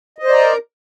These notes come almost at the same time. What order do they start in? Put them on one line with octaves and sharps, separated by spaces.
D#5 C5 D5 A#5 A#4